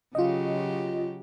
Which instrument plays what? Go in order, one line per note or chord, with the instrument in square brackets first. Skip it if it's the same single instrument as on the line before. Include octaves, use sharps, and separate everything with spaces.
[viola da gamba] C#3 F#3 G4 [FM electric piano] F4 D#5